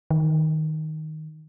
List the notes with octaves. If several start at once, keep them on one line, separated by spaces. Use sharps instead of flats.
D#3